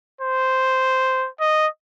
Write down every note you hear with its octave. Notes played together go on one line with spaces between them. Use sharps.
C5
D#5